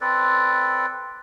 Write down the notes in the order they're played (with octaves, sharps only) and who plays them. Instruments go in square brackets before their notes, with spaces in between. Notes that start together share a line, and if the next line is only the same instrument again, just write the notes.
[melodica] C4 A4 B4 D5